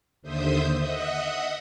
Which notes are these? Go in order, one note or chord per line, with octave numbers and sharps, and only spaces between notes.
D#2 D3 C5 E5 D#6 G6
D#5 E5 F#5 D#6